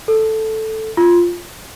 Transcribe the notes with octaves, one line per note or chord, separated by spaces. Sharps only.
A4
F4